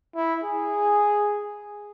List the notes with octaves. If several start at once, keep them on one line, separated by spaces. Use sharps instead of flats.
E4
G#4